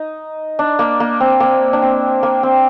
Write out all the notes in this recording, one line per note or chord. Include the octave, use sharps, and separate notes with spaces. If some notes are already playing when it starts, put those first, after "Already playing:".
Already playing: D#4
D4
A#3
A#3
C4
A#3
D4
C4
A#3
C4